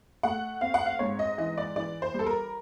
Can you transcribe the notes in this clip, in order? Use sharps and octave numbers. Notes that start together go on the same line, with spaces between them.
A3 F#5
C4 F5
F#5
F5
G#2 C#5
D#5
E3 D#5
D5
E3 D5
C5
G3
A4
A#4